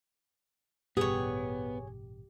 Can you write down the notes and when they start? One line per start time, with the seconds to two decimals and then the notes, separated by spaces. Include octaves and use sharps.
0.97 A1 G2 B2 B3 G4 G#4 C#5